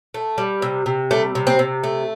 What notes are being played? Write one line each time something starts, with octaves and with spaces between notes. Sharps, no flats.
A3
G3
C3
C3
G3 A3
C3
C4
C3
A3